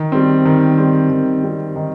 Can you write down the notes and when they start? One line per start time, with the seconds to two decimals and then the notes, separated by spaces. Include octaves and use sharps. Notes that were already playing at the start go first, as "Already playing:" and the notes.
Already playing: D#3
0.12 G3 C4
0.45 D#3
0.78 G3 C4
1.10 D#3
1.44 G3 C4
1.76 D#3